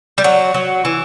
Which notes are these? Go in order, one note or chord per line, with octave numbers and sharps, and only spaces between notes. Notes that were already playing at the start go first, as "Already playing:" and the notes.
G3
F#3
F#3
E3